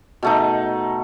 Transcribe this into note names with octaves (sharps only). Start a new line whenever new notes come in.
B2 A3 D#4